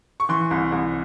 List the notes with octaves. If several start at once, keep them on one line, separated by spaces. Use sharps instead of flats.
C#6
E3 C6
C2
C2